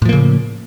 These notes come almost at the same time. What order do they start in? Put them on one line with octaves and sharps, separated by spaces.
A2 F3 A#3 C#3